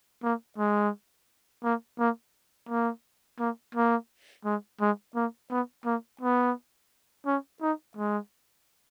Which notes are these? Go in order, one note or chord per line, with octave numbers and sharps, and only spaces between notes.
A#3
G#3
A#3
A#3
A#3
A#3
A#3
G#3
G#3
A#3
B3
A#3
B3
C#4
D#4
G#3